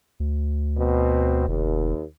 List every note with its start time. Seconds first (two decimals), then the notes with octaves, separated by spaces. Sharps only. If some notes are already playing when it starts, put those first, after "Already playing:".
0.20 D2
0.77 B2 C4
1.47 F1 D#2